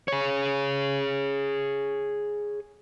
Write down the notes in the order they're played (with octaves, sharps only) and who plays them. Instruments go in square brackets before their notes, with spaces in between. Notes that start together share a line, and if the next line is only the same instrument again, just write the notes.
[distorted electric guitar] G#4 C#5